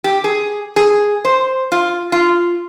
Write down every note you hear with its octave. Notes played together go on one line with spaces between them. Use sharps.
G4
G#4
G#4
C5
F4
F4